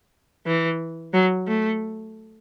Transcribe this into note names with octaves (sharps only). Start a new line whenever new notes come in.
E3
F#3
A3